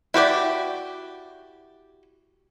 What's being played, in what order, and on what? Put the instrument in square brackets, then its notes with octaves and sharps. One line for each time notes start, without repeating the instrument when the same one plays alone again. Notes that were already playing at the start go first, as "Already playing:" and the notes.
[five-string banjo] E4 F#4 G4 D5